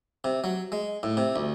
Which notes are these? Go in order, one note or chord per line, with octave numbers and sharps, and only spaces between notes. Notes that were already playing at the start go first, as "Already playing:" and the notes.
C3
F#3
G#3
A2
C3
D2